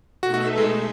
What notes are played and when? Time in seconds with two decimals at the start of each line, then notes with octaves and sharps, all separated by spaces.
0.22 B2 A3 D#4 F#4 A4 E5
0.34 F#4
0.58 G#3